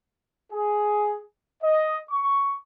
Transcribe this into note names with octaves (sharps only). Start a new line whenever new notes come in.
G#4
D#5
C#6